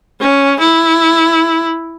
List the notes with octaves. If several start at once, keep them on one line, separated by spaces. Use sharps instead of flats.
C#4
E4